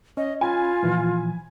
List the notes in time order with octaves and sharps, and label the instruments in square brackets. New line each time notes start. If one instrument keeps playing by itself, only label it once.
[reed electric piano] C#4 [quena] D#5
[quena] F4 [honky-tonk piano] G#5 B5
[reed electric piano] A#2 E3 F3